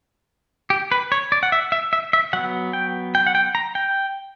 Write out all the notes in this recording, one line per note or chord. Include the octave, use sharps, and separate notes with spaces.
G4
B4
C#5
D5
F#5
E5
E5
E5
E5
F#3 B3 F#5
G5
G5
F#5
G5
A#5
G5